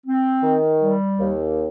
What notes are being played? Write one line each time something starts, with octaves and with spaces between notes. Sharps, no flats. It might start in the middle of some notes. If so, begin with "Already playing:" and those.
C4
D#3
G3
D#2